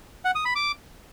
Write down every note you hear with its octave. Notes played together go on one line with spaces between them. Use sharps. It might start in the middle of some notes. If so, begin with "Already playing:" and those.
F#5
D#6
B5
D6